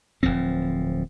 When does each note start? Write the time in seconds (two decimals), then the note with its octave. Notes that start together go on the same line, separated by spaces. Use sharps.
0.23 D1 G1 F3 C4